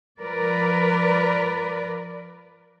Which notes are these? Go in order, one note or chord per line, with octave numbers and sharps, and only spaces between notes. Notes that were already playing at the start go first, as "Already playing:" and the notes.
F3 A#4 B4 D5